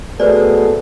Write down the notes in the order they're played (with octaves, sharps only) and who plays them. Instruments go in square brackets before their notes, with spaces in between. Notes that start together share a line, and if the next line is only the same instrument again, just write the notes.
[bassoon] B2 [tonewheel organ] A3 B3 G#4 [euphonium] A4 [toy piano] B4 C5 D5